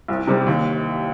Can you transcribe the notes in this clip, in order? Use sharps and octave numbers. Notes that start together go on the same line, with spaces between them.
C2
C3 G3
D#2